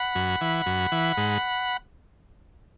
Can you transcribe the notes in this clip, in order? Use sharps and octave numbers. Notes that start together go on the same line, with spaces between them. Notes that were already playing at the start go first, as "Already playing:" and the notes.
Already playing: F#5 B5
F#2
E3
F#2
E3
G#2